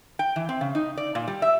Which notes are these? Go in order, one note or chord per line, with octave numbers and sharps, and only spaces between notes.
G5
E3
C4
C#3
D#4
D5
A#2
G3
E5